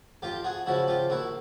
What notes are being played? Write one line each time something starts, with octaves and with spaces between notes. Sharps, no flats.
F2 F4 G4
F#4 G#4
C#3 F3 E4 F#4
F4 G4
A#1 E4 F#4